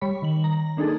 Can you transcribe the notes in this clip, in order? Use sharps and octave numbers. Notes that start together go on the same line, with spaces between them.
G3 C#5 B5
D#3 F#7
A#5
A#3 D4 D#4 G#4 A4